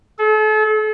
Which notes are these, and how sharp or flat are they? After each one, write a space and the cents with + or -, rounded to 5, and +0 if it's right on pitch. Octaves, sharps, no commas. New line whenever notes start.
A4 -40